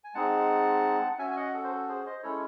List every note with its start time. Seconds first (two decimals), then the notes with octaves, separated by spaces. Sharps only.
0.04 G#5
0.14 G#3 C4 D#4 G#4 F#5 A5
1.19 C#4 F#4 E5 G#5
1.30 G#5
1.36 D#5 F#5
1.54 A4
1.64 C5
1.71 A4
1.89 G#4 C5
2.06 C5 D#5
2.23 G#3 C#4 E4 A4 C#5